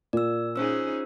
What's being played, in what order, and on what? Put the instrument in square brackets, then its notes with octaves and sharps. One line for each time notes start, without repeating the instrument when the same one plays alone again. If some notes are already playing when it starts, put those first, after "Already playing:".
[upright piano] A#2 [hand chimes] D5 E6
[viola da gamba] C#4 D#4 G#4 [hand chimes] F4 C5 E6